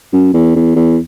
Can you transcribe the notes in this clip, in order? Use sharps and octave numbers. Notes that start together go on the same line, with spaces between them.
F#2
E2
E2
E2